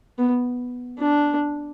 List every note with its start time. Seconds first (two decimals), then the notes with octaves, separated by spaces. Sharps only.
0.18 B3
0.99 D4